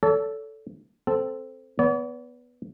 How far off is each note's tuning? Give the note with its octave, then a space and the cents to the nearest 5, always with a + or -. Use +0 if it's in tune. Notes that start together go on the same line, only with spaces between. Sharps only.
A4 +0 C#5 +45
C4 -5 A4 +0
B3 +0 D5 -45